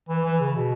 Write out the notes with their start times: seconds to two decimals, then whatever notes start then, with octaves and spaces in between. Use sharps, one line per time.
0.09 E3
0.25 E3
0.40 C#3
0.56 B2